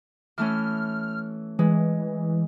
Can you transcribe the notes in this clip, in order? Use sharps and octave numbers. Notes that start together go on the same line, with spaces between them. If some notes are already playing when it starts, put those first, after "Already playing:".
E3 A3 C#4 F6
E3 G#3